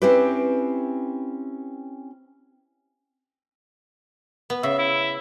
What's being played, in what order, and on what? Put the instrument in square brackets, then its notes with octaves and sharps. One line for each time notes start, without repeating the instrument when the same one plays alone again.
[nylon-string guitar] C4 C#4 E4 G4 B4
[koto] B3
[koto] C#3 [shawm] E5
[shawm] E4